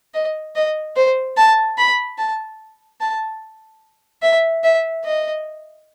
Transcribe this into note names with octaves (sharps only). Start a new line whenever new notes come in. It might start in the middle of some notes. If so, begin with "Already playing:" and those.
D#5
D#5
C5
A5
B5
A5
A5
E5
E5
D#5